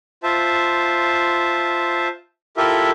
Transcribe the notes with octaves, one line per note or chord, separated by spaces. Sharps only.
F4 C5 E5 A5
E4 F4 G4 A4 A#4 E5